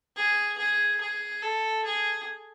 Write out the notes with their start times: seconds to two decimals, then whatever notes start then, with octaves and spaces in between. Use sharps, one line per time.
0.16 G#4
0.57 G#4
1.01 G#4
1.42 A4
1.84 G#4